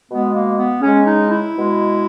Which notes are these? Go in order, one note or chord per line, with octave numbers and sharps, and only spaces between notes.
B2 G#3 B3
A#3
B3
C#3 G#3 C#4
D#4
E4
B2 G#3